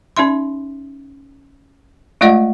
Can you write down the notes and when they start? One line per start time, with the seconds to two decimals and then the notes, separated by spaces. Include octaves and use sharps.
0.17 C#4 D#4 E5 C6
2.21 G#3 A3 F4 D5 D#5 F#5